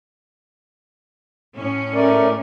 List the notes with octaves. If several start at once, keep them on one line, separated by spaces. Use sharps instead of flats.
A2 C#4
A3 A#4 D5